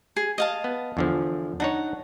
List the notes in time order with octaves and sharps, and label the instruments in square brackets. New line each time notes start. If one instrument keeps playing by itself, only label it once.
[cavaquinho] G#4
D#5 F5 A5
[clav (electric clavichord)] B3
E2 D3 F3
[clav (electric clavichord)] D4 D#4 C#5 [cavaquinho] F#5